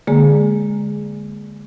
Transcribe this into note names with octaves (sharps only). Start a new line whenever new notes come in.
D3 G#3 A#3 G#4